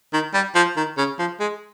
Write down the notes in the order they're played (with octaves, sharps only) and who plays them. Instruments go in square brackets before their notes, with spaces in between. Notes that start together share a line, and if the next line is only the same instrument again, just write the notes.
[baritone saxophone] D#3
G3
F3
D#3
C#3
F3
G#3